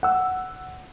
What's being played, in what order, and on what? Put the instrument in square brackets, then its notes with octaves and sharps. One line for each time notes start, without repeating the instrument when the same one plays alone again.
[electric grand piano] F#5 E6